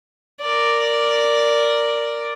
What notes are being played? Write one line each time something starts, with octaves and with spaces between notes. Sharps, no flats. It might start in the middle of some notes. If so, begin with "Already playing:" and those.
A#4 D5